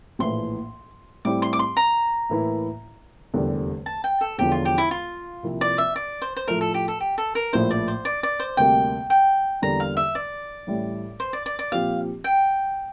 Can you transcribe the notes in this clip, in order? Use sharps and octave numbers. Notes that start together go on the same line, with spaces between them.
A#1 A2 E3 C6
A2 G3 C4 E4 G4 D6
C6
D6
C6
A#5
A2 E3 A#3 E4
F1 E2 D3 G3 A#3
A5
G5
A4
E1 E2 D3 F3 G4
F4
G4
E4
F4
C2 C3 F3 A#3 E4
D5
E5
D5
C5
C5
A2 F3 A3 A#4
A4
G4
A4
G4
A4
A#4
A#1 A2 F3 A#3 E4 C5
D5
C5
D5
D5
C5
D2 C3 G3 A#3 G5
G5
E2 D3 G3 A#3 A#5
F5
E5
D5
A1 A2 G3
C5
D5
D5
D5
A#2 F3 C4 G4 F5
G5